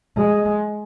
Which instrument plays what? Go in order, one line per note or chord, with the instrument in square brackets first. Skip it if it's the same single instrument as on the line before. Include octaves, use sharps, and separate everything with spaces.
[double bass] G#3